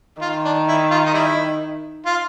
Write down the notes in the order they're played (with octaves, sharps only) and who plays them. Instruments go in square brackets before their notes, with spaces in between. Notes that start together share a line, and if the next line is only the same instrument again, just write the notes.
[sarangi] D#3 [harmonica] F4
[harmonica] D4
E4
F4
D#4
G3 E4
F4